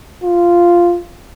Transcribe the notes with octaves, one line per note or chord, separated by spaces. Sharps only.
F4